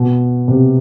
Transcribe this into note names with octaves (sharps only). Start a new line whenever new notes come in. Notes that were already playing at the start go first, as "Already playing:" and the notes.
Already playing: B2
C3